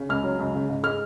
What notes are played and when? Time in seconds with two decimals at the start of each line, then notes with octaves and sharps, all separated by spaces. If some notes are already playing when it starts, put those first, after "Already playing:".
Already playing: C#3
0.09 C#2 F6
0.24 F#3
0.39 C#2
0.55 C#3
0.69 G#2
0.83 G#3 F6